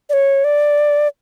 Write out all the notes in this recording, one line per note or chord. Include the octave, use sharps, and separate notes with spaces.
D5
C#5
D5